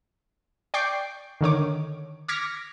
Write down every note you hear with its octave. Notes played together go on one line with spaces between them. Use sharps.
D5 G5 C#6 D6 G6 C7
D3 D#3 C#5 D6
D6 F6 G#6 A#6 B6 C#7